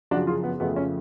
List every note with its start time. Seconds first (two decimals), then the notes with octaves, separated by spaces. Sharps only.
0.11 F#2 C#3 F3 D4 F#4
0.27 F4 G#4
0.43 B3
0.60 F2 C#3 F3 A3 B3
0.76 C#4